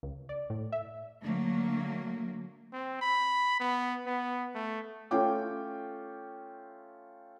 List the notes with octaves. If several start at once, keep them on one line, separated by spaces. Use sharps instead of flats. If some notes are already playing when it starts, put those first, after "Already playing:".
C#2
D5
A2
E5
D3 F#3 A3 A#3
C4
B5
B3
B3
A3
A3 C#4 F4 G5 D6